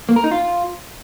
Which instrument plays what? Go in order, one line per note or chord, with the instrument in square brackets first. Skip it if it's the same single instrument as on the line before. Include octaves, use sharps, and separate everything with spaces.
[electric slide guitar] A#3
A#4
D#4
F4